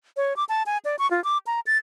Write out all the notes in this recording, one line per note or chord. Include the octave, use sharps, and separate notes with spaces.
C#5
D6
A5
G#5
D5
C#6
F4
D6
A#5
A6